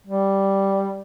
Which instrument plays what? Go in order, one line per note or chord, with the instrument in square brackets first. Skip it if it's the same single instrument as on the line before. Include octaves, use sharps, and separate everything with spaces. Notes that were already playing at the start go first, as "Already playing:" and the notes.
[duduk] G3